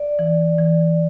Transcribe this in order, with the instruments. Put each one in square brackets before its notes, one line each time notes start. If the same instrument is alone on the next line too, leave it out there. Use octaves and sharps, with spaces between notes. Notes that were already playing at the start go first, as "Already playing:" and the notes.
Already playing: [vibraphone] D5
[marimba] E3
E3